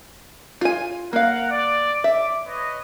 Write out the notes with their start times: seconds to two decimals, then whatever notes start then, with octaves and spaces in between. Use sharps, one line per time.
0.61 F4 G#5
1.13 A#3 A#4 F5 F#5
1.50 D5
2.04 D5 E5 D6
2.46 B4 C#5 D#5